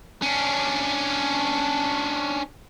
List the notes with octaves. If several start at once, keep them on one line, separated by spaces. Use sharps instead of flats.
C#4 D4